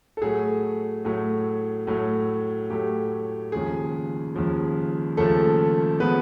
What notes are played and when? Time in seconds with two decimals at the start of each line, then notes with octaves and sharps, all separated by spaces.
0.17 A4
0.22 A2 F#3 A3 G#4
1.05 A2 F#3 A3
1.87 A2 F#3 A3
2.70 A2 F#3 A3 G4
3.52 D#2 C#3 F3 G#3 G#4
4.35 D#2 C#3 F3 G#3
5.17 D#2 C#3 F3 G#3 A3 A4
6.00 C#3 F3 G#3 B3 B4